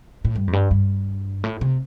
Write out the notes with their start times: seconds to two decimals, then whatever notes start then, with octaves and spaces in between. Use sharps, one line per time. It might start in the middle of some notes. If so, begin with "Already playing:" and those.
0.25 A2
0.36 G2
0.48 F2
0.53 G2
0.71 G2
1.44 A2
1.61 C3